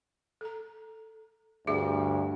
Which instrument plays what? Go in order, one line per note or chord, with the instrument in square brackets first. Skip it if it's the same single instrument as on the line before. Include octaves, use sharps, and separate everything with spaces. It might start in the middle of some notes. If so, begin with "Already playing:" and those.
[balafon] A4 A#5
[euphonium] D2 [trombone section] G2 [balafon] G#4 E5